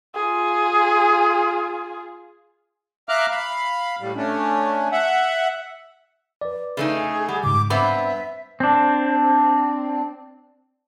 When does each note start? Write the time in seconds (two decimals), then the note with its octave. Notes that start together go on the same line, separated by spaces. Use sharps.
0.14 F4 G#4
3.09 E5 F5 A#5 D6 F6 F#6
3.31 F5 B5
4.01 A2 G3
4.16 A3 C#4 D4
4.92 E5 F#5
6.41 B4 D5
6.77 C#3 A3 D#4 G#4
7.29 G3 F#5
7.43 G#2 C#3 D6
7.70 G2 B3 C4 E5 B5
8.60 C4 D4